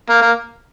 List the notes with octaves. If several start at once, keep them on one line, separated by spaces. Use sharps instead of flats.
A#3
A#3